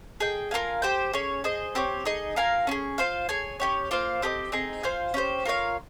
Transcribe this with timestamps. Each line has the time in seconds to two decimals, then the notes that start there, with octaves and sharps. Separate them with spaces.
0.20 G#4 D#5 G5
0.51 F4 A#4 F5 G#5
0.82 G4 C5 G5
1.13 C#4 G#4 C#5
1.44 G#4 C5 D#5
1.75 C4 G4 C#5
2.05 D#4 G#4 D#5
2.36 F4 A#4 F5 G#5
2.67 C#4 F4
2.71 G#4
2.98 F4 C5 F5
3.29 G#4 C#5 G#5
3.60 C#4 G4 C#5
3.91 A#3 F4 C5 F5
4.22 C4 G4 A#4 D#5
4.52 C4 D#4 G#4 D#5
4.83 F4 C5 F5 G#5
5.14 C#4 G4 C5
5.45 F4 A#4 C#5 F5